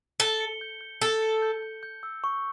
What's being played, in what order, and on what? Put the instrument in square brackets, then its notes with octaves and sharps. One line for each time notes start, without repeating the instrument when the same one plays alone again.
[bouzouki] A4 [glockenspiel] G7
[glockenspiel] C#7
G6
G6
[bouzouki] A4 [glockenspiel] G7
[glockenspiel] C#7
G6
G6
G6
E6
C#6